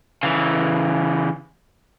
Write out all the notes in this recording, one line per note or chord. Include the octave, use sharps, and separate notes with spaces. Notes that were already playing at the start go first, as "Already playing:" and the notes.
C#3 E3